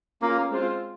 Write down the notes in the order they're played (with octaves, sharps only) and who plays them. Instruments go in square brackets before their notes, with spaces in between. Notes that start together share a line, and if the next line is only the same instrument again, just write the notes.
[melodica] A#3 [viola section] C#4 F4 G#4
[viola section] G#3 C4 F4 C5